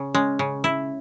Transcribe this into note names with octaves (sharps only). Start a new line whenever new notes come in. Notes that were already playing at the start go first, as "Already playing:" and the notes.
Already playing: C#3
G#3 C#4
C#3
E4